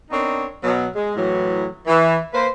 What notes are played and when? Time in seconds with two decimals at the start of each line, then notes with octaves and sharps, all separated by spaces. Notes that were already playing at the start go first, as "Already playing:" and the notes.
0.10 B3 C4 D4 D#4 A#4 C#5
0.63 B2 F#3
0.94 G#3
1.15 A2 E3 F#3
1.86 E3
2.33 A#3 B4 C5